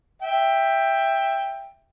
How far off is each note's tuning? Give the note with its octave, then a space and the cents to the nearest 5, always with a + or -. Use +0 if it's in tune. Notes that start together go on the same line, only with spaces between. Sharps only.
E5 +0 G5 +10